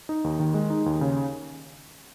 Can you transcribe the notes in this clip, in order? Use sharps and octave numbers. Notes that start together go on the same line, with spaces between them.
D#4
D#2
D#3
G#3
D#4
D#2
C#3